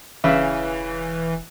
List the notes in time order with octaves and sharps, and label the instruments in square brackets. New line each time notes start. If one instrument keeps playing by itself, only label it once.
[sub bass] E1 [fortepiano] C#3 [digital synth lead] E3 [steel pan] E5